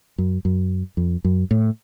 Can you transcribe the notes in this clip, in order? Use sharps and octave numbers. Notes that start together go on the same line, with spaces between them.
F#2
F#2
F2
F#2
A2